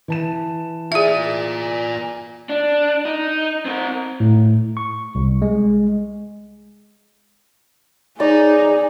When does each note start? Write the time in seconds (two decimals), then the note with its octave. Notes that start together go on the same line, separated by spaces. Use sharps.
0.08 E3 A5 E7
0.92 F4 G#4 D5 E5
2.49 D4
3.05 D#4
3.65 C4 A#4
4.20 A2
4.77 C#6
5.15 C2
5.42 G#3
8.20 D#4 G#4 D5